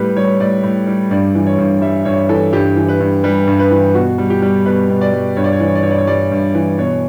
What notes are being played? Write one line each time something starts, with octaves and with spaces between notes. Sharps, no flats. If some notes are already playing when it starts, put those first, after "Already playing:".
Already playing: A2 G3 G4 B4
G3 C#5
A2 D5
A2
G3
G2 D5
E3
C#5
G2
G3 E5
G2 C#5
E3 A4
G2 G4
E3
B4
G2
G3 B4
G2
B4
E3
B2 F#4
G3
G4
G3
B2 B4
B2
D5
G3
G2 C#5
D5
C#5
E3 D5
C#5
D5
G2 C#5
D5
C#5
G3 D5
G2
E3
B2 C#5